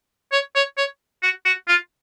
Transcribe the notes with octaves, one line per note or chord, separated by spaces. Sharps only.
C#5
C#5
C#5
F#4
F#4
F4